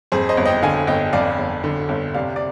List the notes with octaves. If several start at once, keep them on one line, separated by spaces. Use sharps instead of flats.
F2 G#4 C5
C5 D#5
G1
D#5 G5
D3 F5 G#5
G1 D#5 G5
F2 D5 F5
G1
D3
G1
C3 D5 F5
D5